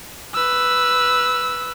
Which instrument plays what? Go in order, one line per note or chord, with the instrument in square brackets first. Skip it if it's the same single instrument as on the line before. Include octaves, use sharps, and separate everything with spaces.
[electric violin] B4 E6